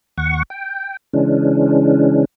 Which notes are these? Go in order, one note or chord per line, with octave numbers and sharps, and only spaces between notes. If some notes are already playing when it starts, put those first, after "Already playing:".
D#2 F#5 C#6
G5
C#3 E3 G#3 C#4 D4